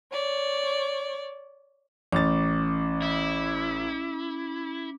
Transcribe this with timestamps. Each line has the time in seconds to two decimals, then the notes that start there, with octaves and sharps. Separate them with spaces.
0.12 C#5 D5
2.12 A1 C#4 D6 A6
3.02 E4